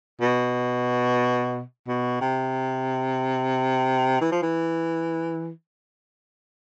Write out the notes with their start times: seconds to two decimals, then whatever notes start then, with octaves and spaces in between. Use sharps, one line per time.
0.21 B2
1.88 B2
2.21 C3
4.21 E3
4.32 F3
4.42 E3